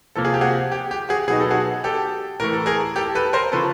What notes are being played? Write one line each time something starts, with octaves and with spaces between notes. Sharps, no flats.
C3 F3 A#3 A4
G#4
G4
F#4 G#4
G4
G4
F#4 G#4
B2 F#3 B3 D#4 G#4
A4
F#4 G#4
G4 A4
A2 E3 A3 A#4
A4
G#4 A#4
G4 A4
A4 B4
A#4 C5
C#3 F3 A4 B4